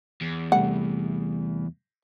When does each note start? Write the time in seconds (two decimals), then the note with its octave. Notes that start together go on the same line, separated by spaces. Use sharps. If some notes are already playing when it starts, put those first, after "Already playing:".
0.21 E2
0.52 C3 G3 A3 F#5